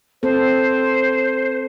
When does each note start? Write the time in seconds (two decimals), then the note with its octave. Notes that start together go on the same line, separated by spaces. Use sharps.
0.23 C4 A4 C5